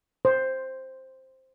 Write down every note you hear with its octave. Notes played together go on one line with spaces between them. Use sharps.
C5